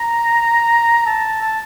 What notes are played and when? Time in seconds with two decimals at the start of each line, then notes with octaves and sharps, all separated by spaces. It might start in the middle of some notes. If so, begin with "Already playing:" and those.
Already playing: A#5
1.06 A5
1.41 A5